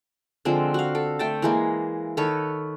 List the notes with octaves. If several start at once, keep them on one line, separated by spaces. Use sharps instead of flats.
D3 F3 G#3 C4
F#4 F5
A4
A3 G5 A5
E3 G#3 A#3
D#3 A4 B4 C#5